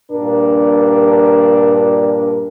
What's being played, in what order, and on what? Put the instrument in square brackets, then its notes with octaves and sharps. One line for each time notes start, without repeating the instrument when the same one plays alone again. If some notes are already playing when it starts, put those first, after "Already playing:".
[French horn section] G2 A#2 D4 A#4